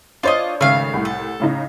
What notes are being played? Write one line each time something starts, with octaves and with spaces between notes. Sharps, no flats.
D4 F4 A4 C5 C#5 D#5
G#1 C#3 A3 F5
C2 A2
A4
A2 C#3 D#4